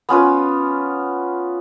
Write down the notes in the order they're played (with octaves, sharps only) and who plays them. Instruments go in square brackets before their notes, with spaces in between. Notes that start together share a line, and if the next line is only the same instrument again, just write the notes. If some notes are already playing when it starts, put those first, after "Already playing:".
[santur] B3 C#4 F4 B4